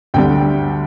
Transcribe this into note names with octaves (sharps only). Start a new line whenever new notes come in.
D2 D3 G3 G5